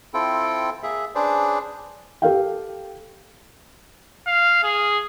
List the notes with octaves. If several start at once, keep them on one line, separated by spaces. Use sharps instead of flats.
C4 E4 F4 A4 G5
A#3 G#4 E5
C#4 D4 G#4 B4 C5 D5
G4 A4 F5 G5
F5
G#4